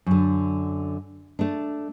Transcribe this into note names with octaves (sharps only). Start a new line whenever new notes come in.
F#2 D3
A3 D4